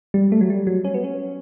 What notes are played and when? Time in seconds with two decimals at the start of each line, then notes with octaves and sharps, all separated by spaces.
0.14 G3
0.32 A3
0.41 F#3
0.50 G3
0.67 F#3
0.85 C#4
0.94 B3
1.04 C#4